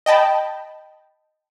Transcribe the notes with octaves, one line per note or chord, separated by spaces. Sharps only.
D#5 G5 A5 B5